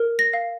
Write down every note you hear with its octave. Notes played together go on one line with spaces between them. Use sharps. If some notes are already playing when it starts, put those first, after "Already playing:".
Already playing: A#4
A#6
F5